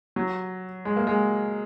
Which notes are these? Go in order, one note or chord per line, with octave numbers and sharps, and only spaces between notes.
F#3
G#3
A#3
G#3